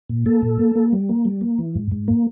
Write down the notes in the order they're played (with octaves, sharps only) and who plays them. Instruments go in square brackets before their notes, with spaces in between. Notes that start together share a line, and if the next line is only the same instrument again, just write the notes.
[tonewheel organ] A#2
A#3 A4
A#2
A#3
A#3
G3
A#3
G3
A#3
E3
G#2
G#2
A#3